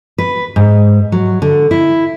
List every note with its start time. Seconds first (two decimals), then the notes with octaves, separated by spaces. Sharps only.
0.18 B4
0.56 G#2
1.12 F#3
1.42 D3
1.71 E4